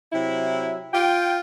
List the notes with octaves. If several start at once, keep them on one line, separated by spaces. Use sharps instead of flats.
C3 F#3 E4
F4 G5